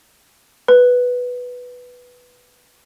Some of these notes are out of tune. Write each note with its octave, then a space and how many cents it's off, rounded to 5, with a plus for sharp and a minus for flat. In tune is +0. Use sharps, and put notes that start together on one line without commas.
B4 +0